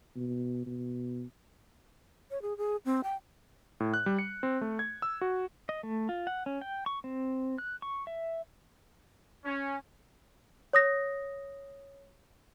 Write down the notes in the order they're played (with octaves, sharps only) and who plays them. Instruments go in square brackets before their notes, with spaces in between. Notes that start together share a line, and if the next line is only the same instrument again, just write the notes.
[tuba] B2
B2
[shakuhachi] C#5
G#4
G#4
C4
G5
[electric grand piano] A2
F#6
G3
C#7
C4
A3
G#6
E6
F#4
[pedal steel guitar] D#5
A3
F4
F#5
C#4
G5
C#6
C4
F#6
C#6
E5
[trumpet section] C#4
[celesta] C#5 D#6 A#6